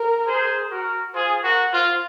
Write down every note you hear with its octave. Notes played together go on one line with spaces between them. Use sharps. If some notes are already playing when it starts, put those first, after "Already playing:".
Already playing: A#4
G#4 C5
F#4 A#4
F4 G#4 C5
F#4 A#4
F4 C5